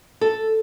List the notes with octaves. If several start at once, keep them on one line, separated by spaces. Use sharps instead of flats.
A4